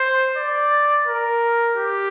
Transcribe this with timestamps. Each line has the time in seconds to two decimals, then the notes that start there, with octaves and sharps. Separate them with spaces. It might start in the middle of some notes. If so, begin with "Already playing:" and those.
Already playing: C5
0.37 D5
1.07 A#4
1.76 G4